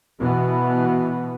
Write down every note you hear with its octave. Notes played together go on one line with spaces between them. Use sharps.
B2 E3 B3